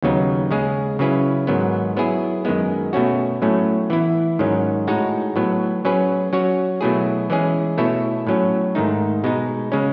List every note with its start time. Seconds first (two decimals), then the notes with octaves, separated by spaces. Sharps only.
0.02 D#2 C#3 F#3 B3 D#4
0.51 C#3 G#3 C#4 G#4
0.99 C#3 F#3 C#4 E4 B4
1.47 G#2 D#3 F#3 B3
1.97 F#3 B3 E4 G#4
2.45 F#2 D#3 G#3 B3
2.93 B2 A3 C#4 F#4
3.42 A2 F#3 A3 C#4
3.90 E3 B3 E4
4.39 G#2 D#3 F#3 C#4
4.88 A2 G#3 D#4 F#4 C#5
5.36 A2 F#3 B3
5.85 F#3 C#4 G#4 B4
6.33 F#3 C#4 F#4 C#5
6.81 B2 F#3 A3 E4 G#4
7.30 E3 G#3 C#4 G#4
7.78 B2 A3 E4 A4 C#5
8.27 A2 F#3 C#4
8.75 G#2 D#3 A3 D#4
9.24 B2 G#3 D#4
9.72 C#3 G#3 C#4